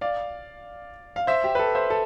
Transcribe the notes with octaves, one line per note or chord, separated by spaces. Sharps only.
D5 F5
F5
C5 E5
G4
B4
A4
C5 E5
A4